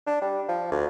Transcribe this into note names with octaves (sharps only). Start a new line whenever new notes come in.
D4
G3
F3
D2